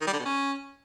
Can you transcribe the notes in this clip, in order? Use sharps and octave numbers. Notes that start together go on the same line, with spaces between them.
D#3
G3
D3
B2
C#4